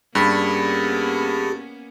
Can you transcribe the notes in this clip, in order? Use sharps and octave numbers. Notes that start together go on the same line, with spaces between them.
G2 A#3 B3 C#4 G4 G#4 B5